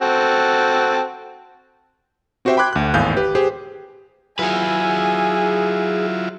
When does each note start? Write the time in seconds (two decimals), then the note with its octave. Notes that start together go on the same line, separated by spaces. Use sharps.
0.02 C4 F#4 A4
2.45 C4 F#4 G4 C5 E5 G5
2.57 G5 B5 C6 D6 F#6 G#6
2.73 D2 F#6
2.94 G#1 E2 A2 F5 G#5 G6
3.17 G4 B4
3.35 G4 G#4 C5
4.39 F#3 E4 F4 G#4 B4 G#5